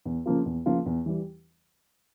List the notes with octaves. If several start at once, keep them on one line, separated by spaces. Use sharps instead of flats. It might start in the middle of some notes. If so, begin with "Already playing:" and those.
E2
C#3 F3 A#3 F4
E2
C#3 F3 A#3 F4
E2
E3 G3